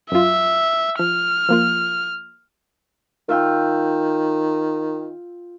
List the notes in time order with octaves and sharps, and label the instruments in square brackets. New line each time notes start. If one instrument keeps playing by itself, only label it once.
[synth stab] F#2 F4 [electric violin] E5
[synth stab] F3 [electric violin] F6
[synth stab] F3 A#3 F4
[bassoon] D#3 [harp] F4 E5 G5